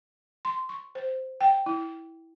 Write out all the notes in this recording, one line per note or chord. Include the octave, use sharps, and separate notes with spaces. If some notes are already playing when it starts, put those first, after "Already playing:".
C6
C#6
C5
G5
E4